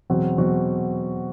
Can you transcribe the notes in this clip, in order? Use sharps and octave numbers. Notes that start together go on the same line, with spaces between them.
E2 B2 F#3 C4 F#4
E2 B2 F#3 C4 F#4